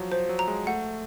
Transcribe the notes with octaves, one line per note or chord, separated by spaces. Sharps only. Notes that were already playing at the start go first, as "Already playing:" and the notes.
Already playing: F3 F#3
F3 C5
F#3
A#5
G#3
A3 F#5